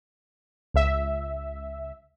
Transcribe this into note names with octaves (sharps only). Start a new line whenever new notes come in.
C#2 E5